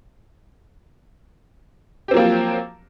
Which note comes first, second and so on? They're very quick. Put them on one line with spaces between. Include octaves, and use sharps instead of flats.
G4 C4 F#3 A#3 F3